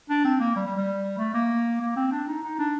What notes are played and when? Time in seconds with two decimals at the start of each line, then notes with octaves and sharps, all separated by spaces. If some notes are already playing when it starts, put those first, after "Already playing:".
0.09 D4
0.24 C4
0.40 A#3
0.56 G3
0.66 G3
0.77 G3
1.18 A3
1.34 A#3
1.80 A#3
1.96 C4
2.12 D4
2.27 D#4
2.43 D#4
2.58 D4